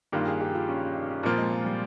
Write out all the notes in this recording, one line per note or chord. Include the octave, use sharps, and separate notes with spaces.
G2 D#3 A#3 F4 G4
G#4
G4
F4
C#4
C#4
D#4
C#4
A#2 F3 A#3 C4 F4
G#3
G#3
G3